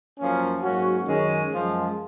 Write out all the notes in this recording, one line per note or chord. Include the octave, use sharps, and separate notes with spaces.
F#2 F3 A#3 C#4
G#2 F#3 A#3 C#4 F#4
F#2 D#3 G#3 C#4
F#2 F3 G#3